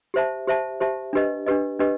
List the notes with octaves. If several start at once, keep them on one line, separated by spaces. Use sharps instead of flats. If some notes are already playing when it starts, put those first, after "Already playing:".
G4 C5 E5 A5
G4 C5 E5 A5
G4 C5 E5 A5
D4 G4 B4 D#5
D4 G4 B4 D#5
D4 G4 B4 D#5